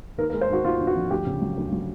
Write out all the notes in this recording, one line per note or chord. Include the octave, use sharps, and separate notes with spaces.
D#2 A#4
A#4
G#3
C5
D#2 F#4
D#2 F4
D3
F#4
F3
D2 G4
C#3
F#3
D2
F#3